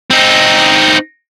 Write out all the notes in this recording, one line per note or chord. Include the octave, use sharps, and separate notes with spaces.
C4 D#4